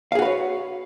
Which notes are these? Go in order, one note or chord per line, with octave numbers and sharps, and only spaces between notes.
F#4 G#4 B4 C#5 F5